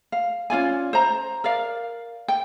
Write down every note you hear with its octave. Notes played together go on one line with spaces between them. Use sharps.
F5
C#4 F4 D5 G#5
C5 A#5
A#4 D5 F5
G5